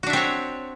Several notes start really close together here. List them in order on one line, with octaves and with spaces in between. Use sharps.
F#4 D4 E5 C4 C#5